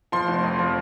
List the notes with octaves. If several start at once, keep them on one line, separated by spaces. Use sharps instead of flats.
F3 C6
F1
F2
F3